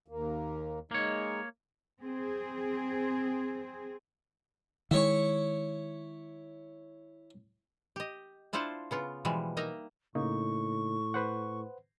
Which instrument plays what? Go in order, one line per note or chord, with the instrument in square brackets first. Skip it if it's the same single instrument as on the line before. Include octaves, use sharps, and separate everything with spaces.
[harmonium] D#2 A#3
[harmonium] G#3 D#4 [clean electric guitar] A#3 C#5
[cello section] C4 G#4
[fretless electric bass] D#3 G#3 [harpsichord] E4 C#5 C#6
[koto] G4 D#5
D4 E4 F4 C5 F#5 A5
C#3 B3 F4
B2 E3 F3 G3 G#3
A#3 D#4 D#5 E5 A#5
[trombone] A2 [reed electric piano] C#3 A#3 D#4 [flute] C#6
[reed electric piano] B4 C5 F#5